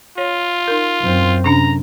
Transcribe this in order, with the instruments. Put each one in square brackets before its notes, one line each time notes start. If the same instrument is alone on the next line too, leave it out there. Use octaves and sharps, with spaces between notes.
[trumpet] F4 [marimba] C#5
[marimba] D#4 A#4
[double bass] F#2 C4
[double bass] F#2 [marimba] C3 C#4 D4 [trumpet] A#5